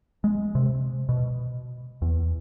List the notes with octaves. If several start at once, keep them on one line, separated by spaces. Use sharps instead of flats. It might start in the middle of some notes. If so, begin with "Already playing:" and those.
G#3
C3
B2
E2